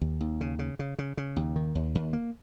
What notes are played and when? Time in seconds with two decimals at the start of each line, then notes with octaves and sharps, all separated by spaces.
0.01 D#2
0.21 D#2
0.41 C#3
0.59 C#3
0.79 C#3
0.98 C#3
1.17 C#3
1.36 D#2
1.56 D#3
1.75 D#2
1.95 D#2
2.13 A#3